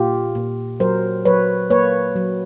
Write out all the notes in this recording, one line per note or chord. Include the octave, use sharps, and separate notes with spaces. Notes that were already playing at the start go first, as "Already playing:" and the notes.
Already playing: A#2 F4 G4
A#2
F#3 A#4 C5
F#3 B4 C#5
A#3 B4 C#5
F#3